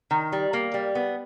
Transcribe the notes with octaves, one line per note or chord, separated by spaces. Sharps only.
D#3
G3
A#3
G3
B3